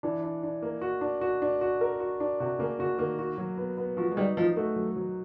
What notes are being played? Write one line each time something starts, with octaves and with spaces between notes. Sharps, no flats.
E3 D4
D4
D4
A#3
F#4
D4
F#4
D4
F#4
A#4
F#4
D4
C3 F#4
C#3 A#3
C#3 F#4
D#3 A#3
F#4
F#3
B3
B3
F3 F#4
G#3
G3 D#4
F3 D#4
A3 F#4
F#3
F#3